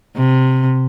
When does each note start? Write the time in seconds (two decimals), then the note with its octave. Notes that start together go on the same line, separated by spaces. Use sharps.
0.16 C3